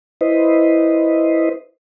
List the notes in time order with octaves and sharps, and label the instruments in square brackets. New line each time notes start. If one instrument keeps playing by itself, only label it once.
[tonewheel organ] E4 B4 C5 D#5